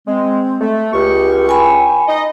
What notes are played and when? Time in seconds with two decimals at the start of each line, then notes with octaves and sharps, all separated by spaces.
0.07 G#3 C4
0.59 A3
0.93 C#2 G4 C#6
1.49 G5 G#5 B5
2.08 D#4 D#5